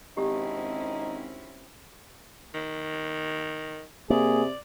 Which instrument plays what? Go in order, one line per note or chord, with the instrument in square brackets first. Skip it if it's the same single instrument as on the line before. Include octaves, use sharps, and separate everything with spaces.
[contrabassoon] G#1 [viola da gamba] C4 C#4 E4 [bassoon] D#4 [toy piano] G4
[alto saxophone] D#3
[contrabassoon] C3 [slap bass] A#3 [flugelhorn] G#4 [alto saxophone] D5